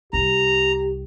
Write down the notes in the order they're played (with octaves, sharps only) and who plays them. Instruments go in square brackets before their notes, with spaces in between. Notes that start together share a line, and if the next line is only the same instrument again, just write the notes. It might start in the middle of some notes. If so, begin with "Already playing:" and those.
[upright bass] C2 [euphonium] G4 [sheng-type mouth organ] A#5